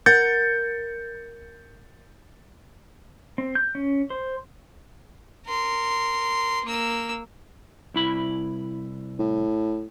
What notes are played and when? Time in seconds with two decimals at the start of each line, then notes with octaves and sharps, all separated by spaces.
0.06 A#4 F#5 G6 A6 C#7
3.38 C4
3.55 G6
3.75 C#4
4.10 C5
5.47 A#4 C6
6.64 A#3 E6
7.94 C2 E4 B5
9.19 A2